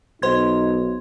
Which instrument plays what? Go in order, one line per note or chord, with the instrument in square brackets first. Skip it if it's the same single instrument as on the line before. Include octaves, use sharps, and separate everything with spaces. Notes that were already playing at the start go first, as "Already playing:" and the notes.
[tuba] B1 [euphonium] D#4 [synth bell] C5 C6 G#6